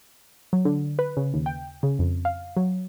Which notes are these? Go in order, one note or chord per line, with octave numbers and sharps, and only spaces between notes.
F#3
D3
B4
C#3
D#2
G5
C#3
F2
F5
F#3